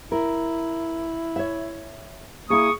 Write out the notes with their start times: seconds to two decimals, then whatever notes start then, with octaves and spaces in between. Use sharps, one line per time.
0.12 E4 A#4
1.36 C#5 E5
2.50 A#3 E4 G#4 C#6 D#6